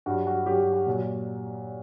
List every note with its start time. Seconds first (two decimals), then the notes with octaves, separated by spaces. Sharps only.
0.06 G2 F#3 F#4
0.27 F#4
0.46 G2 F#3 G4
0.59 F#4
0.73 F#4
0.87 A#2 F#3